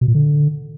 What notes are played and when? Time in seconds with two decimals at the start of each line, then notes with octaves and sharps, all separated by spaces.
0.01 B2
0.08 A#2
0.15 D3